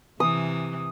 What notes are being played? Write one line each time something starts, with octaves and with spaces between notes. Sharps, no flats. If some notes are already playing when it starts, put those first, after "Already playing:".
C3 E3 D#6